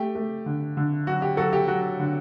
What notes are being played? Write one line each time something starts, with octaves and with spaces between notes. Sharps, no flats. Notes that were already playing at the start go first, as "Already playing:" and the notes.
Already playing: A3 G4
A3
D3
D3
F#3 F#4
G4
F#3 F#4 A4
G4
F#3 F#4
D3